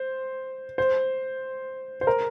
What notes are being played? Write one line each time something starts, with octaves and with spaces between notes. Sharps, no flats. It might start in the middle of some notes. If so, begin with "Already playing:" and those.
Already playing: C5
C5
C5
A#4